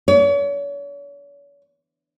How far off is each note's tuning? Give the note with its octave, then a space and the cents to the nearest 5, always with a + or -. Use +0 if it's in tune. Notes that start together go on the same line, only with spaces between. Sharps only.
C#5 +40